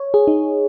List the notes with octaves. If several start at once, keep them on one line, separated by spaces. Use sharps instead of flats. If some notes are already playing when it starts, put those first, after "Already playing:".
Already playing: C#5
G#4
D#4